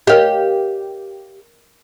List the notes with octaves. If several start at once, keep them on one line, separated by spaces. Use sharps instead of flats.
G4 A#4 C#5 D#5 F5